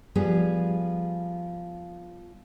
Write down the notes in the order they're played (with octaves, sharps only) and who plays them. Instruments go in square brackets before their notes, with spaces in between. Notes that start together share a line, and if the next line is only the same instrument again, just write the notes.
[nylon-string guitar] F3 G3 B3 G#4